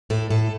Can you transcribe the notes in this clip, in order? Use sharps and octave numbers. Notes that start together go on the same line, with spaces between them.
A2 A4
A2 A4